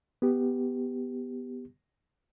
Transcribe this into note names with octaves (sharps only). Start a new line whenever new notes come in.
B3 G4